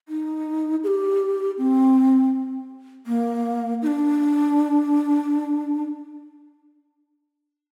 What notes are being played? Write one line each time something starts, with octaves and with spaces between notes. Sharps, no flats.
D#4
G#4
G4
C4
A#3
D#4
D4